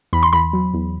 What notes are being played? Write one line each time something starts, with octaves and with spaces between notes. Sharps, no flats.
E2 B5
C6
E2 B5
F#3
E2